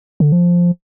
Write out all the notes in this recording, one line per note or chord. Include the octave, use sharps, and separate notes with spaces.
D3
F3